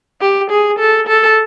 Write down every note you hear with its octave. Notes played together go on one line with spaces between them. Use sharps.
G4
G#4
A4
A4